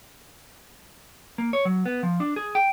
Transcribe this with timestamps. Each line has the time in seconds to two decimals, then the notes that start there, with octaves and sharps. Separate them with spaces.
1.38 A#3
1.53 C#5
1.65 F#3
1.86 B3
2.03 F3
2.20 D4
2.36 G#4
2.55 G5